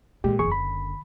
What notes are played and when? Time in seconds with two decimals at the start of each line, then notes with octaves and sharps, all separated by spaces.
0.24 A#2 D#3 G#3 G4
0.39 F#1 E2 D3 G#4 C#6
0.52 B5